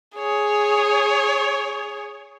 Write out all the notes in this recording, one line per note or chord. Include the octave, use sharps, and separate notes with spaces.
G#4 C#5